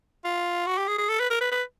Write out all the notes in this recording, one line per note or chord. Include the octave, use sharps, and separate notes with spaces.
F4
F#4
G4
G#4
G#4
A4
B4
A#4
B4
B4